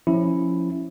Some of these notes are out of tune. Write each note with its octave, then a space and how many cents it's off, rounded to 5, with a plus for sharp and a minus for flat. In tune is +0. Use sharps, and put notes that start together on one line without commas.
F3 +0 C#4 -5 E4 +0